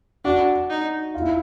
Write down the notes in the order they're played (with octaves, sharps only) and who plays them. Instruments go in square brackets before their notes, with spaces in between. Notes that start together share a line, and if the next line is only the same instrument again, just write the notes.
[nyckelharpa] D4 [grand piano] F#4
[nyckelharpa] D#4
[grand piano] F4
E4